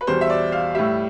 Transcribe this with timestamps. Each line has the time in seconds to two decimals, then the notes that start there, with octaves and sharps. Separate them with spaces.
0.01 B4
0.07 E2 B2 G3 C5
0.21 E5
0.30 D5
0.52 F5
0.75 A2 G3 E5